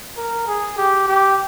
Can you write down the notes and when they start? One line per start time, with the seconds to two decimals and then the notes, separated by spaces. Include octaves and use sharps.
0.17 A#4
0.47 G#4
0.77 G4
1.08 G4